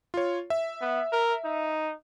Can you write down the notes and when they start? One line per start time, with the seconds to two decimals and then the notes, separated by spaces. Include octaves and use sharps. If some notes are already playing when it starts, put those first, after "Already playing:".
0.14 F4 C#5
0.50 E5
0.81 B3
1.12 A#4
1.45 D#4